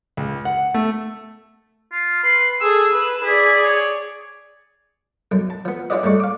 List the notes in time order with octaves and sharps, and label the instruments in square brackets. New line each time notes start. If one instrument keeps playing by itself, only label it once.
[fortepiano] C#2
F#5
A3
[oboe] F4
[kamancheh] B4 [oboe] C6
[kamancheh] G#4 A4 [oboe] E6
[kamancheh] B4
[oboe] E4 [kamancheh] G#4 D5
[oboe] C#5
[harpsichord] B1 F#2
A5
F3 B3
C#4 E4 F4 G4 D5 D#5
G2 G#3 A3 D5 C#6
F5 D6